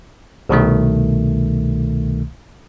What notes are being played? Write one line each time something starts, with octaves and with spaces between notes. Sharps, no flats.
C2 B2 D#3 A3